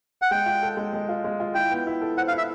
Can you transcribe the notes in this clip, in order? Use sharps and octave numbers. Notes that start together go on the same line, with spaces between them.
F#5
G#3 G5
F4
A4
G#3
G#3
F4
G#3
F4
E4 G5
B3
E4
A4
C5 F#5
F5
E4
E5